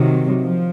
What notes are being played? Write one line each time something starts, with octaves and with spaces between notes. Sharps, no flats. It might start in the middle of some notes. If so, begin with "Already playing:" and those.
Already playing: C3 D#3 F#3
F3